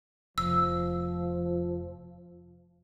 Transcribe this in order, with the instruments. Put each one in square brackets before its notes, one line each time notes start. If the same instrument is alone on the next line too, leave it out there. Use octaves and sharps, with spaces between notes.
[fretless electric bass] F1 [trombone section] F3 [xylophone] E6